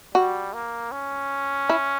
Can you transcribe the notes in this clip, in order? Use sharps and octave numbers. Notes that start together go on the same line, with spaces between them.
G3 F#4
A#3
C#4
E4